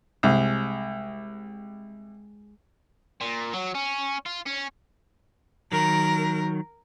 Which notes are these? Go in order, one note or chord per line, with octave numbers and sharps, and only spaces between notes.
C2 G#3
A#2
F#3
C#4
F4
C#4
D#3 F#3 A#4